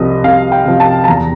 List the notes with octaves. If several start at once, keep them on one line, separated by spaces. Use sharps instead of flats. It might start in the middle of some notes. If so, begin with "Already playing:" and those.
Already playing: C2 C3 F3 D#5
C2 F5
G5
C3 F3
A5
A5
E2 A#5